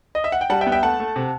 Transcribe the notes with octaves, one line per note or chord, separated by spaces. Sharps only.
D#5
E5
F#5
G5
G3 F#5 A5
E5 G5
B3
E5 G5
A3 F#5 A5
A3
C3